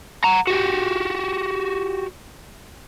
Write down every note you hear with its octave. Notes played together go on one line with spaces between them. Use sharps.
F#5 A#5
F#4 G4